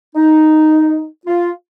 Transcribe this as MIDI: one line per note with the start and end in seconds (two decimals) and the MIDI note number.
0.16 1.06 63
1.26 1.51 65